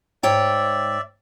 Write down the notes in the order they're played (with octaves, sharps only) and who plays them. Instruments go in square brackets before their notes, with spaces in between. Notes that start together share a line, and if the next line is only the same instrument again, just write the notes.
[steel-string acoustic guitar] G#2 C#5 G5 [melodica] D5 E5